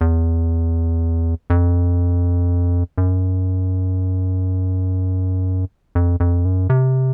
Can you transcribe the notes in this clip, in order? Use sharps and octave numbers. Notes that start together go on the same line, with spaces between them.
E2
F2
F#2
F2
F2
F#2
C3